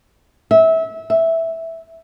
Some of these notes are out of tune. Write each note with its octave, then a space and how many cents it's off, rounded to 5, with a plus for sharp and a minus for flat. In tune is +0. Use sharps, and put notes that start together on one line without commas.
E5 -25
E5 -5